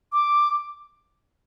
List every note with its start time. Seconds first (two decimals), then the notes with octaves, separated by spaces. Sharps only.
0.12 D6